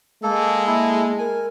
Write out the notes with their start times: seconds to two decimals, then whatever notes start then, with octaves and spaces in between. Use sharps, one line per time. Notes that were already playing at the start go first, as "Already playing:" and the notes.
0.23 G#3 A#3 A4
0.67 A#3 E4 A4
1.19 A#4 G#5